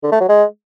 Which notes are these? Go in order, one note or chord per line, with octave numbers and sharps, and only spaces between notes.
D3
A3
F#3
G#3